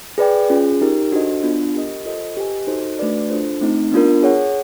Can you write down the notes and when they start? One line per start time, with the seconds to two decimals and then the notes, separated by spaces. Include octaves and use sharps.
0.18 G#4 B4 D5 G5
0.50 C#4 F4 G#4
0.81 D#4 G4 A#4
1.12 D4 F#4 A4 C5 D#5
1.43 B3 D4 F4
1.74 G4 A#4 D#5
2.05 F4 A4 C5 D#5
2.37 G4 B4 D#5 G#5
2.67 D#4 F#4 A4 C5 D#5
2.99 A3 D4 F#4 B4 D5
3.30 D4 F4 A4 C5
3.61 A3 C4 D#4
3.92 B3 D4 F4 A#4
4.23 G#4 C#5 F#5